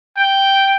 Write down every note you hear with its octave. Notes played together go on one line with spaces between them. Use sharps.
G5